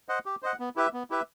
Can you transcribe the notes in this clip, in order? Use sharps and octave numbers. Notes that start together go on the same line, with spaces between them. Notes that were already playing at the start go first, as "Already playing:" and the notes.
C5 D#5 F#5
G4
C5 D#5 F#5
B3
E4 G4 B4 E5
B3
E4 G4 B4 E5